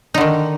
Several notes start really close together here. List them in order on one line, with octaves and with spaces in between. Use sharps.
D#4 D3 D#3